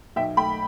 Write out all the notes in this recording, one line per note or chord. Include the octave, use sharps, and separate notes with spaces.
B1 E5 G5
A3 G5 B5